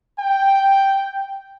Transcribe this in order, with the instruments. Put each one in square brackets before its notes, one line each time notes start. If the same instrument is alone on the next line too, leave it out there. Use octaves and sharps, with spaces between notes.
[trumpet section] G5